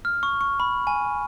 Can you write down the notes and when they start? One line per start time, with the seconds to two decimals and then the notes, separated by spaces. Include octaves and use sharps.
0.05 F6
0.23 C#6
0.41 C#6
0.60 B5
0.87 G#5